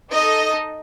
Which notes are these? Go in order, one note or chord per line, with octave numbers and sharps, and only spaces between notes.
D#4 A4 D#5